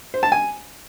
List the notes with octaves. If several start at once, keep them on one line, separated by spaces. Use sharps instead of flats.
C5
A5
G#5